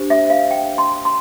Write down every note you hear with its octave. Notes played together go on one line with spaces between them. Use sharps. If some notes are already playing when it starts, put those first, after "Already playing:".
Already playing: D4 G4 C5
E5
F5
G5
C6
C6